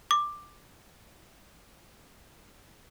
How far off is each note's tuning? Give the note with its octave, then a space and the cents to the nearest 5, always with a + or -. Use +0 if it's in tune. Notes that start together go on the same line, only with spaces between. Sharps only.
D6 +10